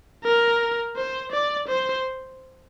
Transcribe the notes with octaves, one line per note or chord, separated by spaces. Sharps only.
A#4
C5
D5
C5